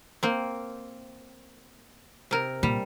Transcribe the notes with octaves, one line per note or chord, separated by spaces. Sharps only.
A#3 C4
C3 A#4
A#2 G3